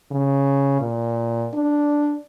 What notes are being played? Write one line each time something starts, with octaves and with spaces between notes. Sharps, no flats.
C#3
A#2
D4